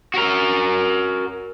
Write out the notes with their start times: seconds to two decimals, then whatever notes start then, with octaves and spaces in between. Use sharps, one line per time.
0.14 F#4 A#4